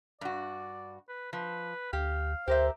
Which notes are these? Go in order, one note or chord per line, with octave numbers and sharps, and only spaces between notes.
G2 F#4 D5
B4
F3 B4
D2 G4 F5
D2 G4 A#4 C5 E5